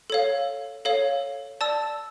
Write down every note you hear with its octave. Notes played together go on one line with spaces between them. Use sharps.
A4 C#5 F5
A4 C#5 F5
D5 A5 E6